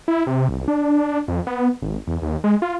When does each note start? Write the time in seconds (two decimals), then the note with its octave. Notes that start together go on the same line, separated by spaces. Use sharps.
0.08 E4
0.27 C3
0.49 C2
0.68 D4
1.28 F2
1.47 B3
1.82 G#1
2.07 E2
2.22 D#2
2.44 G#3
2.62 F4